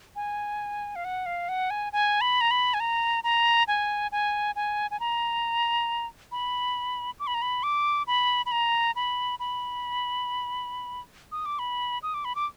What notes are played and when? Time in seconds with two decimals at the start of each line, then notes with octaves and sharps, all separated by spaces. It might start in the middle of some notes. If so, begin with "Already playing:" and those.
0.16 G#5
0.96 F5
1.05 F#5
1.26 F5
1.49 F#5
1.70 G#5
1.93 G#5
2.21 B5
2.41 A#5
2.51 B5
2.74 G#5
2.80 A#5
3.24 A#5
3.68 G#5
4.12 G#5
4.56 G#5
4.91 G#5
5.00 A#5
6.32 B5
7.20 D6
7.27 B5
7.34 A#5
7.42 B5
7.63 D6
8.07 B5
8.46 B5
8.52 A#5
8.96 B5
9.40 B5
11.32 D#6
11.46 D6
11.59 B5
12.03 D#6
12.14 D6
12.25 B5
12.35 D6